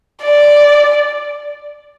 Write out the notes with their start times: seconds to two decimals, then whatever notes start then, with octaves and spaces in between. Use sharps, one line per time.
0.24 D5